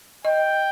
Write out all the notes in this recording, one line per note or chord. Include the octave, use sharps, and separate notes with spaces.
D#5 G5